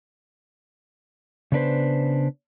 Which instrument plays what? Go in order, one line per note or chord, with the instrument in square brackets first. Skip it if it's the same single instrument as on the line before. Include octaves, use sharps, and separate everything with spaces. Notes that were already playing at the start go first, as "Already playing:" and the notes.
[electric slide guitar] C#3 B3 D4 B4 C5